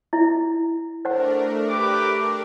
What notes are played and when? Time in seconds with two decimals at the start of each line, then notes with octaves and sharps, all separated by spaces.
0.13 E4 E5
1.05 A3 D4 A#4 C5 F#5
1.68 G4 B4 D6